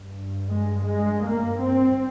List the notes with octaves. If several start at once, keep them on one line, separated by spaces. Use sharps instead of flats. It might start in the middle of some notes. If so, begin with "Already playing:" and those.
Already playing: G2
G#3
G#3
A#3
C4